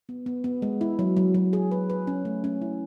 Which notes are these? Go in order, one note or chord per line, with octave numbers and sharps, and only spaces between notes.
B3
B3
B3
G#3
E4
F#3
F#3
F#3
G#4
B4
B4
C#4
A3
C#4
E4